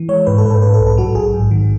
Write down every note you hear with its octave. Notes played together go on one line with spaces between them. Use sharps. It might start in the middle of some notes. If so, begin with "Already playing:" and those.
Already playing: E3
G#3 C#5
G#2 B4
A4
G#2 B4
A4
A2 B4
A4
B1
A4
F#3 F#4
A1 G#4
G#2
D#3